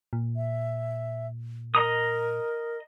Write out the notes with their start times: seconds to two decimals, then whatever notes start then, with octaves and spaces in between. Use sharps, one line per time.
0.13 A#2
0.36 E5
1.75 A#4 D#5 A#5 D#6